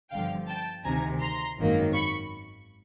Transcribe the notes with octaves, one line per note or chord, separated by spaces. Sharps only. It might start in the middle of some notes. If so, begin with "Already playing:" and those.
G1 G2 D3 F3 F5 G5
G5 A5
D2 C3 D#3 G#5 A#5
A#5 C6
G#1 F#2 D#3 F#3 A#3
B5 C#6